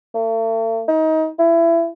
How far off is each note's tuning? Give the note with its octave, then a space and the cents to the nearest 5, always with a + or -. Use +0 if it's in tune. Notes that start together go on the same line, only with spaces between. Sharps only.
A3 +45
D#4 +25
E4 +25